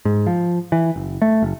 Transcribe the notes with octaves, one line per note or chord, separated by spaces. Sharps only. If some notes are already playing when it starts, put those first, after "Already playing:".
G#2
F3
E3
F#1
A3
F#1